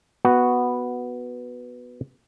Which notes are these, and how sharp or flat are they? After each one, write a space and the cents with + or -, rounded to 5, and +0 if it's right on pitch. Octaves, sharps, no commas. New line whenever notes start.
B3 +0 F#4 +0